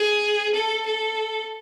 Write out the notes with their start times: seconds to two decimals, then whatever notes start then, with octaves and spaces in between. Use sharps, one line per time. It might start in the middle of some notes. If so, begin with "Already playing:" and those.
Already playing: G#4
0.54 A4
0.86 A4